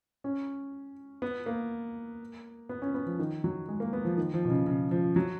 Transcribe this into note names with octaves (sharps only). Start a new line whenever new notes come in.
C#4
B3
A#3
B3
C#4
B3
F3
D#3
F#3
G#3
A#3
B3
F3
D#3
F3
B2
C#3
C#3
F3
F#3